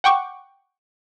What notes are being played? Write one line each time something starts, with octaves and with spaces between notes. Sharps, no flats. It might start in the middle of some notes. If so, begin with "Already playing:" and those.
F#5 G5 C#6 D6